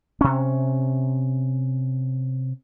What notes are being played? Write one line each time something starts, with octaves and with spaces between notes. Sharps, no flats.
C3 C#4